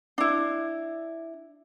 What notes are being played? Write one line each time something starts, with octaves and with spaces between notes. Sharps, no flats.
D4 E4